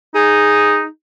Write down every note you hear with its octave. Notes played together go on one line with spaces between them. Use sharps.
D#4 G#4